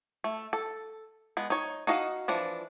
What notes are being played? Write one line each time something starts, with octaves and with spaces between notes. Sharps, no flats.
A3
A4
G#3 B3
D#4 C#5
D#4 F#4 D#5 F5
E3 F3 D4